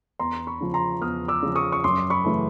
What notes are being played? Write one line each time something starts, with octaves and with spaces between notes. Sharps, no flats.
E2 A#5 C6
B5 C#6
C#3 F3
A#5 C6
E2 D#6 F6
D6 E6
C#3 F3
C#6 D#6
C#6
F#2 C6 D6
B5 C#6
C#3 E3 A3